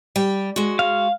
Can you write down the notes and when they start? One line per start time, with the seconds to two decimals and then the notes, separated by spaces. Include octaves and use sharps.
0.16 G3 G5
0.56 G#3 F#4
0.79 F5